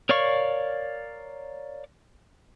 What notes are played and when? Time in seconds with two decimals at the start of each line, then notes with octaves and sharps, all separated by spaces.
0.09 A#4 C#5 D5 F5 C#6